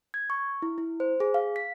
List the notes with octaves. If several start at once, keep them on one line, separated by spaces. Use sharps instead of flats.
G#6
C#6
E4
E4
C5
G#4
F5
B6